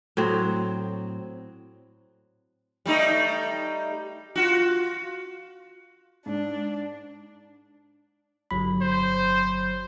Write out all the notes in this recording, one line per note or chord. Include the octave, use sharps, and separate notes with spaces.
A2 F#3 C4
G3 A3 D#4
F4 F#4
G#2 D4
G1 F#3 B5
C5